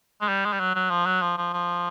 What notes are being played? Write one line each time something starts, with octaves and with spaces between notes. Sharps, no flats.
G#3
G3
G#3
G3
F#3
F#3
F3
F#3
F3
F3
F3